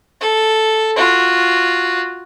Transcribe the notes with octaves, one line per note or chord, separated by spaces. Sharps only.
A4
F4 F#4